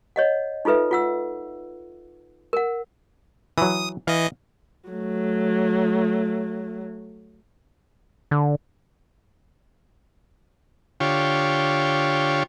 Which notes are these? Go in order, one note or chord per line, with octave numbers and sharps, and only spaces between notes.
C#5 D#5 F#5
D#4 F4 A4 B4 E5
F4 F#5 E6
A#4 F#5
E3 F#3 D#6
E3 D#5 F5
F#3 A3
D3
D3 F4 G4 C#5